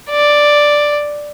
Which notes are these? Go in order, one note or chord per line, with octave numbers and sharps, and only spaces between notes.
D5